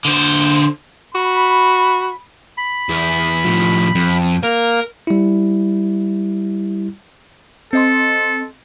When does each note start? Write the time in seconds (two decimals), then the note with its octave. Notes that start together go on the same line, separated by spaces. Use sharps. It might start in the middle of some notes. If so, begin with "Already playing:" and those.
0.05 D3 C5
1.15 F#4 B5
2.58 B5
2.89 E2 E4
3.45 A2 F3
3.95 F2
4.43 A#3 A#4
5.07 G3 E4
7.73 C4 A4 D#5 C6